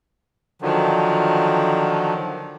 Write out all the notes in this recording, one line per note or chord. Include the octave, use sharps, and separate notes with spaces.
D3 D#3 F3 F#3